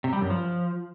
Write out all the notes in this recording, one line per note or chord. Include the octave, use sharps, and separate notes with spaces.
C3
G3
F#2
F3